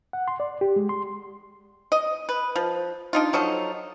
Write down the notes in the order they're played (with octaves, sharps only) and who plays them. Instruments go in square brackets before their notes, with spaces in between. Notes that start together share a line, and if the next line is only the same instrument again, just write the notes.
[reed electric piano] F#5
C6
D5
G4
G#3
C6
[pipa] D#5
B4
F3
D4 D#4 F4
F3 F#3 D#4 A4